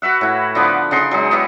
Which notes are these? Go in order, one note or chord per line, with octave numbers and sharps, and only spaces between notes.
F#4 B4 E5 F#5
A2 E4
D3 F3 B3 B4
C#3 D#4 C6
F#3 G#3 D#4
B3 D#4 E4 G4